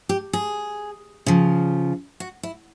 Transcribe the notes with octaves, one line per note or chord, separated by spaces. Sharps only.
G4
G#4
C#3 F3
F#4
E4